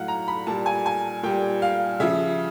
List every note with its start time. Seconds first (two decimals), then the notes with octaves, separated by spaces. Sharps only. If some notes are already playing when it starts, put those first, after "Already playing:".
Already playing: A2 F#3 F5 F#5
0.08 A#5
0.28 B5
0.47 A#2 G3 A5
0.66 G#5
0.86 G#5
1.23 A#2 G3 G5
1.62 F5
2.00 C#3 F3 E5